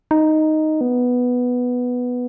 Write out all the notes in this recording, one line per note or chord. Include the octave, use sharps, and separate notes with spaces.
D#4
B3